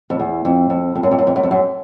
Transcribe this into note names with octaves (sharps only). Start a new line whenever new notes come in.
F2
E2
F2
F2
F2
F#2
F2
F#2
F2
F#2
F2
F#2